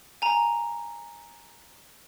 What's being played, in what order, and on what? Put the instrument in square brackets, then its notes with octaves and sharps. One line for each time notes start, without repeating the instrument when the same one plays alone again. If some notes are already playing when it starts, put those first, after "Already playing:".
[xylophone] G#5 A#5